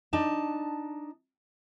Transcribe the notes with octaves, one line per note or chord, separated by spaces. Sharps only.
D4 D#4 A5